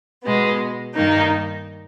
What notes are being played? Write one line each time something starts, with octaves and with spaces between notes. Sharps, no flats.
B2 G#3 B3
G2 D#3 A#3 D#4